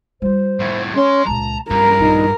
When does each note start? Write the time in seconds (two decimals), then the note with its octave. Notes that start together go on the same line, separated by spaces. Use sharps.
0.22 G3 F4 C5
0.60 C2 A2
0.95 G#3 C#4 C6
1.27 C#2 A#2 A5 A#5
1.70 G2 C#4 A#4 A#5
2.00 A#1 D#3 D#4